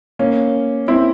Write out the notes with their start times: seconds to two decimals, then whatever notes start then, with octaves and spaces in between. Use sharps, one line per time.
0.19 A#3 C#4
0.88 C4 E4